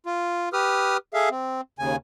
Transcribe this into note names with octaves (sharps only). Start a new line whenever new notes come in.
F4
G4 B4 D#6 F6
G#4 A4 E5 F5
C4
D#2 C#3 G#5